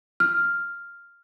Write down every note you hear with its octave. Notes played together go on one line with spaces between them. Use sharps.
F6